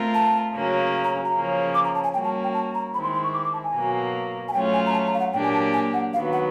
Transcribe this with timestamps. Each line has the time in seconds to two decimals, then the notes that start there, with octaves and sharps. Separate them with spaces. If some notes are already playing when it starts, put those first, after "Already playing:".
Already playing: A3 C4 F4 A#4
0.14 A5
0.55 C#3 F#3 A#3 C#4
1.04 A#5
1.25 A#5
1.34 C#3 F3 A#3 C#4
1.74 D6
1.84 A#5
1.95 A5
2.04 G#5
2.14 G3 A#3 C#4 F#4 G5
2.24 A5
2.44 G5
2.54 A5
2.75 A#5
2.93 D#3 G#3 C4 E4 B5
3.03 C6
3.14 C6
3.24 C#6
3.34 D6
3.44 D6
3.53 A5
3.64 G#5
3.74 B2 F#3 A#3
4.48 G#5
4.53 F#3 A3 C#4 F4 G5
4.74 G#5
4.86 A#5
4.93 A5
5.07 A#5
5.14 F5
5.20 F#5
5.33 A#2 F#3 A#3 D4 G4 G5
5.44 G#5
5.54 A5
5.73 G#5
5.94 F#5
6.13 D#3 F#3 B3 F5
6.33 F#5